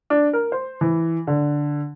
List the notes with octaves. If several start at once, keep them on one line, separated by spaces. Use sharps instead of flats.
D4
A#4
C5
E3
D3